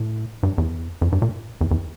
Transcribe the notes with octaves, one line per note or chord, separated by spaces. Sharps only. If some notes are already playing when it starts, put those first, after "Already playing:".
Already playing: A2
G2
E2
F2
G2
A#2
E2
E2